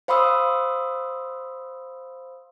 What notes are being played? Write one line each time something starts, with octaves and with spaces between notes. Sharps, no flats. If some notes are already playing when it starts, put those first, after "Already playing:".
C5 F5 B5 C6 D#6 E6